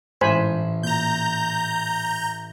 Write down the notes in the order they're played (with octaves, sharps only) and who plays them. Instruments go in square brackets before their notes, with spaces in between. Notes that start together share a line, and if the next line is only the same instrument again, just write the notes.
[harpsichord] A1 [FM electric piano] G#2 E4 [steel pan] C5 G#5 B5
[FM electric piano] A#2 [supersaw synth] A#5 G6